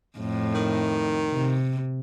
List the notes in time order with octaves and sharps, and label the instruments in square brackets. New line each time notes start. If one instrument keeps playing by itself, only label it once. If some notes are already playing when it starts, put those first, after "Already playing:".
[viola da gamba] F2 A2
[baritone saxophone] D#3
[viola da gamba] C3